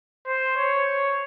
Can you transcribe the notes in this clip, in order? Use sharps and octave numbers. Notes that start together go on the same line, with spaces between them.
C5
C#5